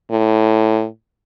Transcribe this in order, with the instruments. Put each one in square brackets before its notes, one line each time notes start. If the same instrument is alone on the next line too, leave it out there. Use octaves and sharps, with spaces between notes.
[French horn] A2